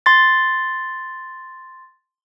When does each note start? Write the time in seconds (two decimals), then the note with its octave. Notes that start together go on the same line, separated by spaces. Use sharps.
0.06 C6 A6